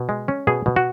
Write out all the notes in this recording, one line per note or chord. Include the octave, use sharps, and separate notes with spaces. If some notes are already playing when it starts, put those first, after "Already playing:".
Already playing: B2
G#3
C#4
B2 G#4
B2
F#4